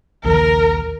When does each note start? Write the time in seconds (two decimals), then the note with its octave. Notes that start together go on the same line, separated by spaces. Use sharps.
0.24 A#1 D#2 D#3 A#4